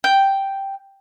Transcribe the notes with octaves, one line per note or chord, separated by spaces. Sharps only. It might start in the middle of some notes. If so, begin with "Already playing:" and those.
G5